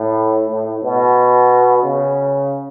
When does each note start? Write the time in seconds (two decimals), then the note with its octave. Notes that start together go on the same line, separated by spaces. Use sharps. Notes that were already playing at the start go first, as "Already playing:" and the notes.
Already playing: A2
0.49 A2
0.83 B2
1.83 C#3